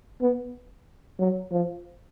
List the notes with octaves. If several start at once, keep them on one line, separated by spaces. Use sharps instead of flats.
B3
F#3
F3